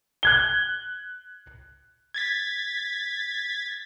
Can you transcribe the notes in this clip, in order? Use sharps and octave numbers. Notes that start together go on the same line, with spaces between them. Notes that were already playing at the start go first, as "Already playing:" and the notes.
F#6 G#6 G7
G#6 A6 B6